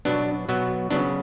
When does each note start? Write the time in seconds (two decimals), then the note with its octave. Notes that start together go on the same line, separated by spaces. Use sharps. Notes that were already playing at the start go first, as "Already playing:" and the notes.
0.05 B2 F#3 B3 D4
0.49 B2 F#3 B3
0.90 C#3 F#3 B3 D4